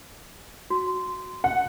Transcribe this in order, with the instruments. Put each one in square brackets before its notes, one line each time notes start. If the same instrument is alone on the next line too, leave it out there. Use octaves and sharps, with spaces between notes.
[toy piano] F#4
[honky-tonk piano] F#5